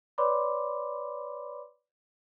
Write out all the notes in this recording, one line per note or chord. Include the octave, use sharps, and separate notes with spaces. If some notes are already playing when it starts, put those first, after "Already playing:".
B4 C#5 D5 B5 C6 D6